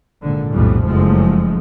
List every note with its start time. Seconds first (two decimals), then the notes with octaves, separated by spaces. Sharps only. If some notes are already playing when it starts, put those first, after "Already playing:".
0.22 G#1 A#2 D3
0.51 B1 F2 A2 E3 G3
0.85 F#1 F3 G#3 A3